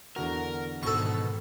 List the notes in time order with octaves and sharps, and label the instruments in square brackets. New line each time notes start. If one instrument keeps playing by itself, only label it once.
[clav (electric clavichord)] E2 D3 F#4 [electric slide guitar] A#4
[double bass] G#2 D#3 [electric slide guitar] B2 [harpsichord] A4 C#6